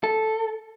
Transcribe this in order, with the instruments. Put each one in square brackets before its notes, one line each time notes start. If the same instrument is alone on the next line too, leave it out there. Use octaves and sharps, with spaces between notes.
[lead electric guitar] A4